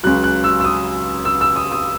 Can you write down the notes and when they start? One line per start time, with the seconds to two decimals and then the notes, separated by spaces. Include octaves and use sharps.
0.03 C#2 C#3 F#3 F#6
0.24 F#6
0.44 E6
0.60 E6
0.64 D#6
1.25 E6
1.41 E6
1.56 D#6
1.72 D#6